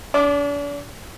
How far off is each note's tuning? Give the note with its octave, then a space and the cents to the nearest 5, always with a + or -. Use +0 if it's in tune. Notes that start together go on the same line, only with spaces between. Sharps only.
D4 -40 D6 +0